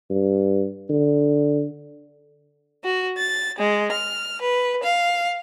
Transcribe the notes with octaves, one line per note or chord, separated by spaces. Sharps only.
G2
D3
F#4
A6
G#3
F6
B4
F5